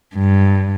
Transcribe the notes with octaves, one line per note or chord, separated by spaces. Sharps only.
G2